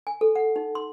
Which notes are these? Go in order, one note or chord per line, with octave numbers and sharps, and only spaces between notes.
G#5
A4
F#5
D#4
C6